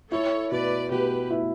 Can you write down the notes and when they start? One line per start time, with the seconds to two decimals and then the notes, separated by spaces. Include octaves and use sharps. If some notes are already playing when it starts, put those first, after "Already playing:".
0.11 E4 A4 C#5
0.51 B2 B4 D5
0.91 B2 G4 B4
1.30 E4